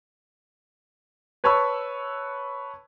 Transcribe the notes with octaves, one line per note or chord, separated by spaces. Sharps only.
B4 C#5 A5 B5 C#6 E6